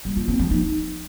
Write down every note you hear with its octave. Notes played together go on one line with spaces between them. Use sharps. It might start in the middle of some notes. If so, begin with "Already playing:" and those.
G3
F4
C4
F3
D#4